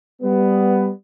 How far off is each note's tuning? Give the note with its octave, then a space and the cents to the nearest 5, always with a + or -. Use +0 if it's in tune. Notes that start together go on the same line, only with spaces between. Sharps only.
G3 +0 B3 +10